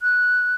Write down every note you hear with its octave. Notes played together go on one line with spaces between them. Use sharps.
F#6